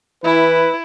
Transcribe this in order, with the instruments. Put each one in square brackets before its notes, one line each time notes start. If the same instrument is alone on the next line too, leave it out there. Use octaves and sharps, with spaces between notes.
[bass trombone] E3 [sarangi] E4 [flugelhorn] B4